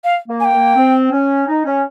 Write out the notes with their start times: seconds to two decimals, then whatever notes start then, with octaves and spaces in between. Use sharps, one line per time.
0.04 F5
0.28 A#3
0.40 G#5
0.45 G5
0.52 A#3
0.76 C4
1.11 C#4
1.47 D#4
1.65 C#4